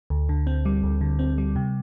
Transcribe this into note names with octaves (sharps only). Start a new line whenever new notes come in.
D2
D3
C4
G3
D2
D3
C4
G3
C3